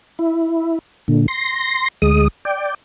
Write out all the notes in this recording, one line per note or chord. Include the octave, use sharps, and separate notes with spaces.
E4
A#2 D3
C6 A#6
D2 G#3 D#6
D5 G5